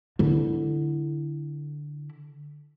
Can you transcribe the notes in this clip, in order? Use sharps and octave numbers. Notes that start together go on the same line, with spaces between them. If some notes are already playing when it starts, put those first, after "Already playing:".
D3 E4